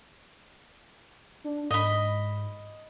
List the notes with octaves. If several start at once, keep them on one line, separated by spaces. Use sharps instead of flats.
D4
G#2 D#5 B5